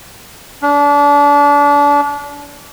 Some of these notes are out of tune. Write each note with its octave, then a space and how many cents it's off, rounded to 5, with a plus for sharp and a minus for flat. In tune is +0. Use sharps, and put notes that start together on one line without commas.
D4 -30